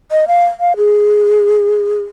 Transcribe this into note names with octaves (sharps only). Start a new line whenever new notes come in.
D#5
F5
F5
G#4